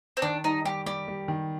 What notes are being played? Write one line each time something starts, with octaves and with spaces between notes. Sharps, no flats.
C4
D#3 D4
G3 D#4
G3 G4
G3 G4
G3
D#3